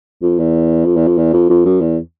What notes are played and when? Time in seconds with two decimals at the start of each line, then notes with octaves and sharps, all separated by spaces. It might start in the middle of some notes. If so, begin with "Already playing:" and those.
0.22 F2
0.39 E2
0.85 F2
0.96 E2
1.07 F2
1.17 E2
1.33 F2
1.50 F2
1.65 F#2
1.81 E2